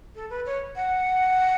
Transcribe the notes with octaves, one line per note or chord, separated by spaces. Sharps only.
A4
B4
C#5
F#5